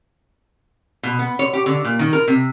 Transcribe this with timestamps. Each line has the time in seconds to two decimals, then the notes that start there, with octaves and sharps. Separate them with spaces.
1.03 B2
1.19 B3
1.39 C#5
1.53 G4
1.66 D3
1.85 A#2
1.99 D#3
2.13 A#4
2.28 C3